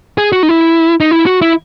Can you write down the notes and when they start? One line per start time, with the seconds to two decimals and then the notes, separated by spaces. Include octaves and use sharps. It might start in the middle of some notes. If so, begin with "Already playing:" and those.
0.18 G#4
0.33 F#4
0.43 D#4
0.49 E4
1.00 D#4
1.11 E4
1.26 F#4
1.42 E4